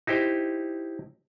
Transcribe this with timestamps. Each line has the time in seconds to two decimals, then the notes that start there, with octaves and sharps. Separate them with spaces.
0.07 D#4 E4 G4 C5